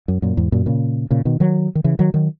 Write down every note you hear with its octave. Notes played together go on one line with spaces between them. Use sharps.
F#2
F#2 A#2
E2 G#2
F#2 A#2
A#2 C#3
A#2 C#3
B2 D#3
D#3 F#3
D#3
C#3 E3
D#3 F#3
D#3 F#3